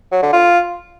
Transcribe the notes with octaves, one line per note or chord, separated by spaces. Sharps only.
F#3
D3
F4